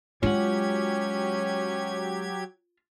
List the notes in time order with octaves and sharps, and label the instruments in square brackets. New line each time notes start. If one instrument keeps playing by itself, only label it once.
[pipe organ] F#3 G4 G#6 [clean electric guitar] G#3 F#5 [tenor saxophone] C#4 [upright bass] F4